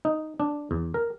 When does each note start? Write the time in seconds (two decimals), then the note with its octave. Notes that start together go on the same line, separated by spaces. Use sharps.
0.05 D#4
0.40 D4
0.71 E2
0.94 A#4